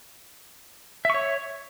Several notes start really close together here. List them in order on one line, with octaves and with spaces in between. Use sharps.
E5 C#6 C#5